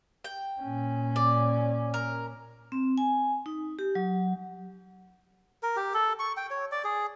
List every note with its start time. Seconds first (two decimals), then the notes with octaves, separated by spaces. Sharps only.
0.24 G5
0.61 A#2 C#4
1.16 D5
1.94 A#4
2.72 C4
2.98 G#5
3.46 D#4
3.79 G4
3.95 F#3
5.63 A#4
5.76 G4
5.94 A4
6.19 C#6
6.37 G5
6.51 C#5
6.72 D5
6.84 G#4